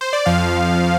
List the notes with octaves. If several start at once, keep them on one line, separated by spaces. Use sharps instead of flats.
C5
D5
F2 F3 F5